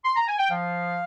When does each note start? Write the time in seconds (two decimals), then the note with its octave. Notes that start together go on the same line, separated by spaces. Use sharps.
0.05 C6
0.16 A#5
0.28 G#5
0.39 G5
0.51 F3 F5